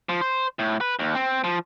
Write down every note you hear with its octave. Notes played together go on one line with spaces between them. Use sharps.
F3
C5
A2
B4
D#2
C4
F3